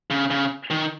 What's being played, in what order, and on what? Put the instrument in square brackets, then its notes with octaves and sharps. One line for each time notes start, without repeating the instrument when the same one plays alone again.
[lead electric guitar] C#3
C#3
D#3